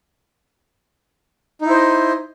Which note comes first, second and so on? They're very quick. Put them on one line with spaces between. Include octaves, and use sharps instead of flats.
D#4 E4 C5 D#5